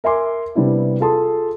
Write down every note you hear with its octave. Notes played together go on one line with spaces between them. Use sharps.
A#4 E5 G#5 C6 D6
C3 G3 B3 D4 E4
F4 G#4 A4 A5 C6 D#6